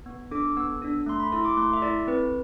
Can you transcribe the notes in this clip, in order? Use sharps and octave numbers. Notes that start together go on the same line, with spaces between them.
B3
D4 A4 D6
B3 E6
D4 A4
A3 C6
B5
E4 A4 C6
D6
A3 C6
E5
E4 A4 D5
C4 B4